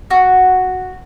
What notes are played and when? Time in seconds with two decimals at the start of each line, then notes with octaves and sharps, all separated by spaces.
0.11 F#4